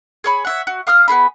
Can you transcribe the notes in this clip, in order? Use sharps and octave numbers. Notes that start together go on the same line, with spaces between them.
G#4 C#5 B5
C#5 E5 F#5
F#4
F5 D#6 F6 G6
B3 F4 G#4 B5